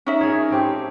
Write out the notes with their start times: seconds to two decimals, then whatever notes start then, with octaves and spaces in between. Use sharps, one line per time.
0.06 C#4 D#4 E5
0.21 G#4 A#4 C#5
0.50 A3 C4 G4